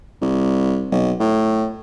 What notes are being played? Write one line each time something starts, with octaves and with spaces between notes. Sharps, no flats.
C2
B1
A2